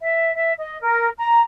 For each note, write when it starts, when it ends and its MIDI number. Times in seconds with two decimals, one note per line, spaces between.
0.01 0.33 76
0.35 0.52 76
0.58 0.78 75
0.81 1.08 70
1.18 1.40 82